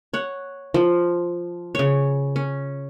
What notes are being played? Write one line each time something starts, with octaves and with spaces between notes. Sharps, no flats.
C#5 F#5
F3
C#3 C#5
C#4